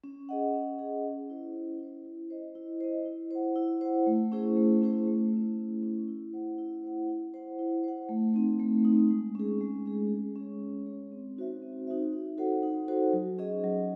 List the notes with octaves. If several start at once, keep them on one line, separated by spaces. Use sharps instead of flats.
C#4
G#4 D#5 F#5
C#4
G#4 D#5 F#5
C#4
E4 C5
C#4
E4 C5
E4
C5 D#5
E4
C5 D#5
E4
C5 F#5
E4
C5 F#5
A3
C#4 E4 G#4 C5
A3
C#4 E4 G#4 C5
A3
C#4 E4
A3
C#4 E4
E4
C5 F#5
E4
C5 F#5
E4
C5 F#5
E4
C5 F#5
A3
C4 D#4
A3
C4 D#4
G#3
C#4 G#4
G#3
C#4 G#4
G#3
C#4 G#4 C#5
G#3
C#4 G#4 C#5
C4
D#4 F#4 C5 E5
C4
D#4 F#4 C5 E5
D#4
F#4 A4 C5 F#5
D#4
F#4 A4 C5 F#5
F#3
C#4 G#4 D#5
F#3